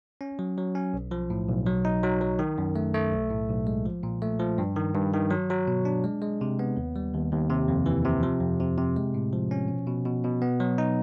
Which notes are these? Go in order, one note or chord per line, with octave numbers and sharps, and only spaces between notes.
C#4
F#3
F#3
C#4
B1
F3
A2
B1
F#3
D#4
F#3
F#3
D#3
F#2
A3
A3
B1
A2
B1
G#3
F3
A#2
A3
F3
G2
D#3
G2
D#3
F#3
F#3
B2
D4
G#3
G#3
C3
B3
D#2
G3
D#2
D#2
C3
F2
E3
C3
F3
F2
C3
C3
G#3
A2
F3
C#4
B2
B2
B2
B2
B3
F#3
D#4